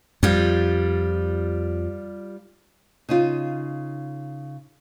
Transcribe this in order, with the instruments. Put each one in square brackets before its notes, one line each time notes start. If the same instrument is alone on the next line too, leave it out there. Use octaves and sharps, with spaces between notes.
[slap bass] F2 [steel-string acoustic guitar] G3 F4
[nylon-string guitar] C#3 D#4 F4